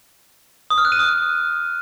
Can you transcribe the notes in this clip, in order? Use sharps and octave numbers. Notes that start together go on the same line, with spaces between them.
D#6
F6
F#6
D#7
D#6